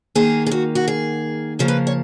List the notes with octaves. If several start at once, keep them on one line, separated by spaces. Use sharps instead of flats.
D#3 A#3 G#4
G#4
F#4
F#4
G#4
C#3 F3 A#3 A#4
B4
C#5